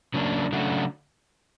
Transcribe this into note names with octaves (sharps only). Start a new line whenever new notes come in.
C#3 F#3 A#3 D4
C#3 F#3 A3 D4 F#4